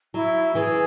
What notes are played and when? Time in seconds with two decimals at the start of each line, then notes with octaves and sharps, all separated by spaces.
0.14 F#3 E4
0.55 E3 G#4